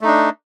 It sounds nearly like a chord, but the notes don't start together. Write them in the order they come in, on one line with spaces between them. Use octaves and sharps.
A3 D#4 D4